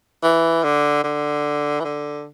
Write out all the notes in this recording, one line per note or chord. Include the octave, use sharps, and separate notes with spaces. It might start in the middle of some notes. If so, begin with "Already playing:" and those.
E3
D3
D3
E3
D3